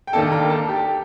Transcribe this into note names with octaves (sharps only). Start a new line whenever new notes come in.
G5
D#2 D#3 A#3 D4 A4 A5
A#4 A#5
A4 A5
G4 G5